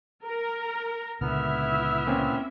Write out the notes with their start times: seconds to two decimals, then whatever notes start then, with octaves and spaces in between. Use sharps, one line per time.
0.24 A#4
1.21 C#2 A#2 D3 B3 E4 E5 F6
2.07 A#3 C4 C#4